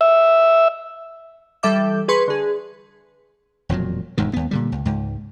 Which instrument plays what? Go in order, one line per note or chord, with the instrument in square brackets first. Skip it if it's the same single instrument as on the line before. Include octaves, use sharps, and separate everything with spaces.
[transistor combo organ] E5
[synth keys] E3 G3 A4 E5 D6 G6
G#4 B4 C6 C#6
D3 G#4
[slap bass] E1 F2 A#2 F#3
E1 D2 G#2 D#3
D#2 B3
A#2 D3 G3
C#2
C#2 G#2